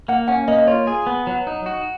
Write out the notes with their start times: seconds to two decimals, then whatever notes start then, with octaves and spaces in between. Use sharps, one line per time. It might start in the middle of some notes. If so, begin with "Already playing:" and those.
0.08 A#3 F#5
0.28 C#4 F#5
0.48 A#3 D#5
0.58 D#5
0.67 F4 C#5
0.87 G#4
1.06 B3
1.27 F#3
1.47 D#4
1.66 F#4